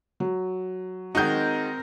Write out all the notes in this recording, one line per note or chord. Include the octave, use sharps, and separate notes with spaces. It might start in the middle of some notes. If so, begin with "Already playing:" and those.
F#3
D#3 G#3 C4 D#4 F#4 A#4 G6